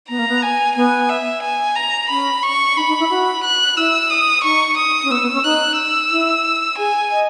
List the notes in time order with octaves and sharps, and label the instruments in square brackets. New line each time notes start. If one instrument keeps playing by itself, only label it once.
[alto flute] B3 [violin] A#5
[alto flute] A#3
B3
[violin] G#5
[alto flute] B3 [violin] G#5
[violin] E5
G#5
A#5
[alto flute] C#4 [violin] B5
[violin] C#6
[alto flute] D#4 [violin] B5
[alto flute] D#4
E4
F#4
[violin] F#6
[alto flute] E4 [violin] E6
[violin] D#6
[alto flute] D#4 [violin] C#6
[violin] D#6
[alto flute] C#4
[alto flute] B3 [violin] E6
[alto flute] B3
C#4
[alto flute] D#4 [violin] F#6
[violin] E6
[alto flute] E4
[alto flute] G#4 [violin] G#5
[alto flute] D#5